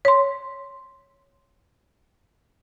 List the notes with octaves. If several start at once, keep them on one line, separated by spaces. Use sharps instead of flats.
C#5 C6